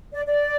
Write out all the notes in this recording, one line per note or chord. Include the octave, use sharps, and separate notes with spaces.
D5
D5